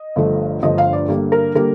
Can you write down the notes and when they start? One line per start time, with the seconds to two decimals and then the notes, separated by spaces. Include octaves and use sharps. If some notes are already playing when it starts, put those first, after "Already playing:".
Already playing: D#5
0.16 G1 G2 D3 F3 A3
0.62 G1 G2 D3 F3 A3 D#5
0.78 F5
0.93 D5
1.08 G2 D3 G3 A#3
1.32 A#4
1.55 D3 G3 A#3 A#4